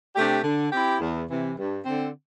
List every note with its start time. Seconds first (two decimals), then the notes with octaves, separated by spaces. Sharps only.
0.15 C3 A3 D4 G4
0.44 D3
0.72 C4 E4 G4
1.00 E2
1.29 C3 E3
1.57 G2
1.85 D3 C4